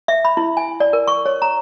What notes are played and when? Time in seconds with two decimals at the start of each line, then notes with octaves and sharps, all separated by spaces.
0.08 E5
0.25 B5
0.37 E4
0.57 G#5
0.80 D5
0.93 A#4
1.07 C#6
1.26 C#5
1.42 A#5